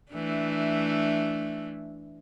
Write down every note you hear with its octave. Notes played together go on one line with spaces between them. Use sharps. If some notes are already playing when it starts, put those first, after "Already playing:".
E3 A3 D4